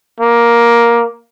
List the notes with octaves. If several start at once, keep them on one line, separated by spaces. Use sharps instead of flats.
A#3